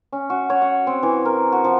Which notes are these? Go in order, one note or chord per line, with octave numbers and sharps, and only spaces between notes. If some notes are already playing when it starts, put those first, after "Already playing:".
C#4
F#4
C#5
F#5
C4
E3
A#4
F#4
F3